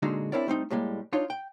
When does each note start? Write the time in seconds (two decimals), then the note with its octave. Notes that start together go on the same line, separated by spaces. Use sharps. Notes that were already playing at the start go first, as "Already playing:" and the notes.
0.02 A#2 D3 G#3 D#4 F#4
0.32 C4 D4 E4 A#4 C#5 D5
0.47 G3 A3 C4 D#4
0.71 A2 G3 G#3 A#3
1.13 D4 D#4 F4 C#5
1.30 G5